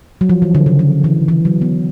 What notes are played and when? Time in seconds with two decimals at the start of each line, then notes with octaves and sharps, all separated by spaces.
0.21 F#3
0.29 F3
0.42 E3
0.55 D3
0.66 C#3
0.79 D3
1.04 E3
1.28 E3
1.45 F#3
1.61 B3